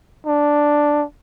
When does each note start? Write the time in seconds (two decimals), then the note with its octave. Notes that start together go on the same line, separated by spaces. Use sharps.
0.27 D4